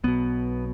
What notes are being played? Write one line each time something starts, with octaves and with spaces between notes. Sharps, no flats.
B1 B2 B3